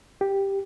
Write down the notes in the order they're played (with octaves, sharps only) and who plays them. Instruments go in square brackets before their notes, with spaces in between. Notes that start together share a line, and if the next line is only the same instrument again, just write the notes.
[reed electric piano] G4